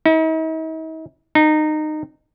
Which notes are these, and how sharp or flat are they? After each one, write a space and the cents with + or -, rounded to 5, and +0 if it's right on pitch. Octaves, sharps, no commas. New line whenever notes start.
D#4 +45
D#4 -20